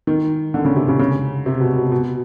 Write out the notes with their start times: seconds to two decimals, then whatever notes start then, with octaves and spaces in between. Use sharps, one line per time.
0.07 D#3
0.54 D3
0.65 C#3
0.76 C3
0.88 C#3
0.99 C#3
1.46 C3
1.61 B2
1.76 B2
1.92 B2